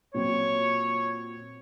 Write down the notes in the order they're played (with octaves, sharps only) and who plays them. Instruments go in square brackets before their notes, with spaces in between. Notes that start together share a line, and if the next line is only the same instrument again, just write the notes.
[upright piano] A#2 F#3 C4 F4 [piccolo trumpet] C#5